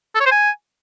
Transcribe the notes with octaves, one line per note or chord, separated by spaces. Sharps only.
A4
C#5
C5
G#5